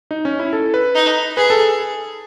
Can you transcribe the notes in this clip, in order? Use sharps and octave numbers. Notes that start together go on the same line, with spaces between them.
D#4
C#4
E4
A4
B4
D#4
G#4 B4
A4